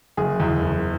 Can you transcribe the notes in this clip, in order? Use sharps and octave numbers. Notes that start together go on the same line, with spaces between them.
F#1 G#4
E2
F#1